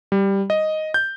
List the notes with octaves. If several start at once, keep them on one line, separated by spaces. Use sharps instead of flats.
G3
D#5
G6